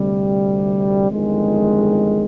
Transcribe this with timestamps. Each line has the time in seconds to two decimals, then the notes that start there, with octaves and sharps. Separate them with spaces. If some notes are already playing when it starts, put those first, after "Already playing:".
Already playing: D2 C3 G3
1.09 G1 F2 D#3 G#3